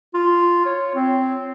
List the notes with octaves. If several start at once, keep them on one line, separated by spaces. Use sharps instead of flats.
F4
C#5
C4